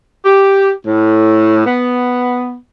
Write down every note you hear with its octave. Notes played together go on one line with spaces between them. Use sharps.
G4
A2
B3